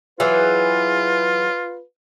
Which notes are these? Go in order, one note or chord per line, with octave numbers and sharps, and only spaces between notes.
E3 F#3 F4 G#4 B4